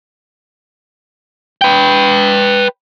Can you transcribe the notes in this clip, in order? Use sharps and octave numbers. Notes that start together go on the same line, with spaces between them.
B4 G5